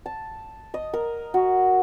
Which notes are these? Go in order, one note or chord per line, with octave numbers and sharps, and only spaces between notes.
A5
D#5
A#4
F#4